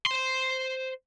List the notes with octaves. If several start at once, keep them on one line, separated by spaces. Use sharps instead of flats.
C5 C6